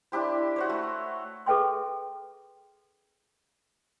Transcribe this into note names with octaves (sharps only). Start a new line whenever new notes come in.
D4 E4 G4 C5
F#4 C5 C#5
A3
G#4 A4 B4 E5 G5 C6